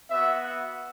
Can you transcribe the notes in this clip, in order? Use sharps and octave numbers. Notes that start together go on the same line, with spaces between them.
B3 F#4 E5
F#5